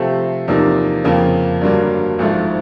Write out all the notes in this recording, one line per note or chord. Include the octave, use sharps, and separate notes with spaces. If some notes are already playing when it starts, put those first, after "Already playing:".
Already playing: C3 F3 A3 C4
E2 C3 F3 A#3 D#4
F2 C#3 F3 A#3
G2 D3 F#3 A#3 D4
G#1 G#2 F3 A3